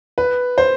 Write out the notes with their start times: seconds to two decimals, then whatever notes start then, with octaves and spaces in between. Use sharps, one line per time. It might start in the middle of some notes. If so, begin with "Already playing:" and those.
0.18 B4
0.58 C5